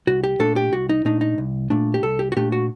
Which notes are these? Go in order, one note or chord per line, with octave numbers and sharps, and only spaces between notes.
C2 F#4
G4
A#2 A3 D4 A4
G4
C2 F#4
D#4
A#2 A3 D4 D#4
D#4
C2
A#2 A3 D4
G4
C2 A4
G4
F#4
A#2 A3 D4 G4
F#4